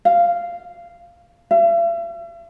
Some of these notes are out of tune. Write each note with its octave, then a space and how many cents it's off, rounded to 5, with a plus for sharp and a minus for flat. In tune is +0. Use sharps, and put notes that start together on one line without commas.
F5 -10
E5 +45